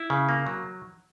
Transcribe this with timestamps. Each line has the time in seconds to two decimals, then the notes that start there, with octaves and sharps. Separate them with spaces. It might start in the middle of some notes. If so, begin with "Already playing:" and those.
Already playing: E4
0.10 C#3
0.29 A#3
0.46 F#3